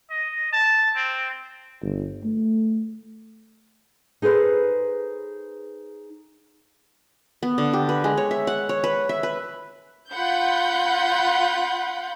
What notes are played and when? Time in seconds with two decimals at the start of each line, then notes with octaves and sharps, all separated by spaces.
0.10 D#5
0.53 A5
0.96 C4
1.81 G1
2.24 A3
4.22 D#4 G#4 A4 B4 C5
7.43 B3
7.58 D3
7.73 G4
7.89 B4
8.04 G#3
8.17 C#5
8.31 E5
8.47 F#5
8.69 C#5
8.84 B4
9.09 E5
9.23 B4
10.11 F4 F#5 B5 G6